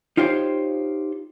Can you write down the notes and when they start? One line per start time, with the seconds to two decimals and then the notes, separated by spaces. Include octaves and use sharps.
0.17 D#4 F4 G4 C5 C#5 F5